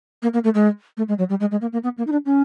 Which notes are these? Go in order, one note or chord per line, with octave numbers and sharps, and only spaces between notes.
A#3
A#3
A3
G#3
A3
G#3
F#3
G3
G#3
G#3
A#3
A#3
B3
A#3
D#4
D4
C#4